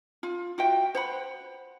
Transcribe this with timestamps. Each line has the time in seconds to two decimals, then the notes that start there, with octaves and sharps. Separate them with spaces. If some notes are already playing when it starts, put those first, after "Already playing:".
0.23 F4
0.58 F4 F#4 E5 G5
0.95 C5 F#5 B5